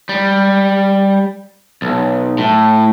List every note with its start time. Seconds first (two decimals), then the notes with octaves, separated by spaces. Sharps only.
0.09 G3
1.82 B1
2.38 A2